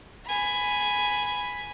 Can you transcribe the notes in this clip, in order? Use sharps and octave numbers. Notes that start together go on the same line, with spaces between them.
G#5 B5